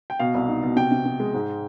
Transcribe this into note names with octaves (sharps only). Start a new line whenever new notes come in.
G5
B2 F5
C2
D#4
B2
C3 G5
C3
C3
G#3
G#2